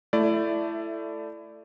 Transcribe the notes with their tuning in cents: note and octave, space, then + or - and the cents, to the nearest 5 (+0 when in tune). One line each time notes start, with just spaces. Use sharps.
A3 +0 E4 +20 D5 +0